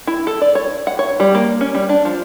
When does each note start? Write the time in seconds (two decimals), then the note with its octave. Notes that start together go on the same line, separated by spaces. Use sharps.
0.07 E4
0.27 A4
0.42 D5
0.55 C#5
0.87 F#5
0.99 C#5
1.20 G3
1.35 A#3
1.61 C#4
1.75 G3
1.89 D4
2.05 F3